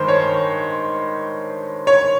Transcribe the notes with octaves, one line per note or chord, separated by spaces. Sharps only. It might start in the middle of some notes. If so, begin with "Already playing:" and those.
Already playing: G2 D#3 G#3 C5
C#5
C#5